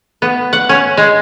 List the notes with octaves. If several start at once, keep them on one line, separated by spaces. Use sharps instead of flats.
B3
F#5
C#4
G#3